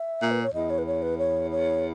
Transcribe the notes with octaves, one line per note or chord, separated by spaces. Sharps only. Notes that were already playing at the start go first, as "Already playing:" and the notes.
Already playing: E5
A#2
B4
C#5
E2 D#5
C#5
B4
C#5
B4
C#5
C#5